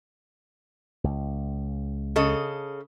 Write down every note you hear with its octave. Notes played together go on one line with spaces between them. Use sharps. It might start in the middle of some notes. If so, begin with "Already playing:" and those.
C#2
C#3 A4 D#5